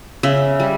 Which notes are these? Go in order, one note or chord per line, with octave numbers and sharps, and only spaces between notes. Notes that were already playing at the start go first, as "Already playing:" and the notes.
C#3 E5
G3